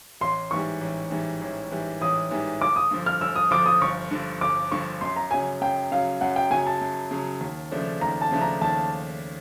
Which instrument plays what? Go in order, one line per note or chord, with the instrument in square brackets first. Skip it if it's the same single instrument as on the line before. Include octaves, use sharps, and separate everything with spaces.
[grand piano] A1 [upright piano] C6
[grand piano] G#2 E3 G3 [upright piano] C#6
[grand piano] A1
G#2 E3 G3
A1
G#2 E3 G3
[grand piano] A1 [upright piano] D#6
[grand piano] G#2 E3 G3
[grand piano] G1 [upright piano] D6
[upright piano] D#6
[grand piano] G2 D3 F3
[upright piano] F6
[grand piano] G1 [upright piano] E6
[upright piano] D#6
[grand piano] G2 D3 F3 [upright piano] D6
[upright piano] D#6
[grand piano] G1 [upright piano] C#6
[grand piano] G2 D3 F3
[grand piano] G1 [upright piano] D6
[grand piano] G2 D3 F3 [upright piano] C#6
[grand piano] F#2 [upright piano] C6
[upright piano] A#5
[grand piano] C#3 F#3 [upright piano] G#5
[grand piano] F#2 [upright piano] G5
[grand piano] C#3 F#3 [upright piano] F5
[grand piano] F#2 [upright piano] F#5
[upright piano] G5
[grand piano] C#3 F#3 [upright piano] G#5
[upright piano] A5
[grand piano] F#2
C#3 F#3
D#2
C#3 F3 A3 D4
[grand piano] D#2 [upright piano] A#5
[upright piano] A5
[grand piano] C#3 F3 A3 D4
[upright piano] A#5
[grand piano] D#2 [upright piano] A5